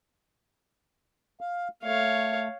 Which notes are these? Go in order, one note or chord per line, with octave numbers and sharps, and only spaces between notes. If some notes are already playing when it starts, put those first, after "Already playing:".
F5
A3 C#5 F5